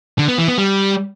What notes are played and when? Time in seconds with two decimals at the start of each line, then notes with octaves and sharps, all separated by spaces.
0.19 D3
0.28 B3
0.38 E3
0.48 B3
0.58 G3